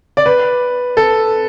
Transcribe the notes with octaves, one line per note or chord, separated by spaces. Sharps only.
D5
B4
A4